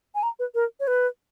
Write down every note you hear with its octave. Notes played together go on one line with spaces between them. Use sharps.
G#5
A#5
B4
A#4
C#5
B4